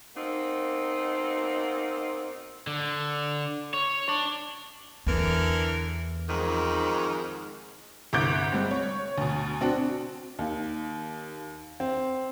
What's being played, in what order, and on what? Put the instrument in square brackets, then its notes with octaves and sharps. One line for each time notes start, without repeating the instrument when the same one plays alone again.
[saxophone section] B2 A#3 C4 D#4
[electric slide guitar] D3
C#5
D4
[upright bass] E2 [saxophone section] D3 E3 A#4
[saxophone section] F2 G#2 D#3
[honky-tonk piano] G1 C2 D6 F#6 G6 D7
G3 G#3 C4
C#5
D2 B2
C4 D4 F#4
[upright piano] D#2
C4